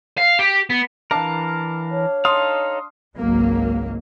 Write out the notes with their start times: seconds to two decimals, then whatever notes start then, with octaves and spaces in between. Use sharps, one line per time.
0.18 F5
0.39 G4
0.70 B3
1.11 E3 D4 A#4 F5 A5
1.91 C#5
2.25 D#4 A4 F5 C6 D#6
3.18 G#1 C#2 F#3 A#3